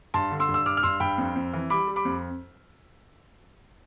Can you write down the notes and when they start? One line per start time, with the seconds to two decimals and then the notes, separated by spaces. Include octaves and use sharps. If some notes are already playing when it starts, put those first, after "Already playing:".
0.14 G2 A5 C6
0.31 D3
0.40 C6 E6
0.49 G2
0.54 E6
0.66 G2 D6 F6
0.77 F6
0.83 G2 C6 E6
1.00 G2 G5 B5
1.18 F2
1.36 F2
1.53 E3
1.70 G3 B5 D6
1.87 G3
1.96 B5 D6
2.05 F2